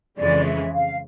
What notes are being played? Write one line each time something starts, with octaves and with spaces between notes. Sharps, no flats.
F2 C#3 E3 G#3 D5
E5
F5